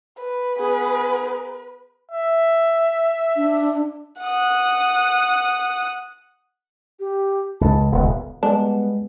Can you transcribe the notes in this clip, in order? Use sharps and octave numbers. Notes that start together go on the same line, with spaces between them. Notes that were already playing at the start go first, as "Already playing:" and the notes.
B4
B3 G#4
E5
D4
F#5 D#6
G4
C#2 A5
D#1 C#2 B3
G3 G#3 B3 D4